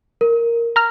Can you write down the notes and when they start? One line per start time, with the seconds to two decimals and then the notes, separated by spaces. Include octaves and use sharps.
0.21 A#4
0.76 A#5 F6